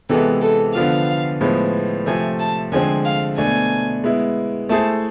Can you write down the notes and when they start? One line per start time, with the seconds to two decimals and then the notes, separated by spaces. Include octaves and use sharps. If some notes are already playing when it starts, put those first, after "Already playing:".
0.09 C3 E3 G#3 B3 A4
0.42 A4
0.75 D3 F3 B3 F4 F5
1.41 A2 F3 G#3 B3
2.06 C3 F3 A3 G#5
2.40 A5
2.72 D3 F3 G#3 C4 G#5
3.05 F5
3.37 B2 A3 D4 G#5
4.04 G#3 B3 E4
4.69 A3 E4 G#4 C5 A5